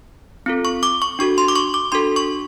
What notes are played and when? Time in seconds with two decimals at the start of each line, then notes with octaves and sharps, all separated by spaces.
0.46 C4 F4 A4
0.65 C#6
0.83 D6
1.02 C#6
1.19 D4 F#4 A4 C#6
1.38 C6
1.48 D6
1.56 C#6
1.74 D6
1.92 D4 F#4 A4 C6
2.16 C#6